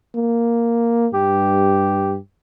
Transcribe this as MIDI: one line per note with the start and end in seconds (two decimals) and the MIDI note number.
0.16 1.08 58
1.13 2.18 43
1.13 2.15 67